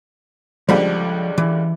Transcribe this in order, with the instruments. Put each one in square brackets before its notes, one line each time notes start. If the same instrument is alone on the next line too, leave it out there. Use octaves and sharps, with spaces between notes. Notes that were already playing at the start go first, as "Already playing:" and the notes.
[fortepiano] C#2 D3 G3 [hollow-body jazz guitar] F3 B5
[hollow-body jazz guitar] E3